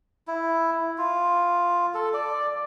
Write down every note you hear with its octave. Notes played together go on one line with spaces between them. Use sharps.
E4
F4
A4
D5